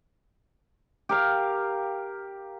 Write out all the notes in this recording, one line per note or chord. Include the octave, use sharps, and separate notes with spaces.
G4 A#4 F5